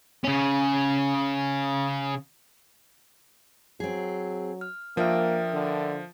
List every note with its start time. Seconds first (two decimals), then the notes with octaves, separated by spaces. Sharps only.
0.24 C#3 C#4
3.80 F#3 C4 G#4
4.61 F6
4.97 F3 A#3 D4 A#4 E5 G5 F6
5.53 D3